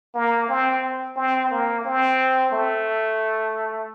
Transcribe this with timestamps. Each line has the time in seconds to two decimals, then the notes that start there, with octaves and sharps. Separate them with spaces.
0.15 A#3
0.49 C4
1.16 C4
1.51 A#3
1.85 C4
2.52 A3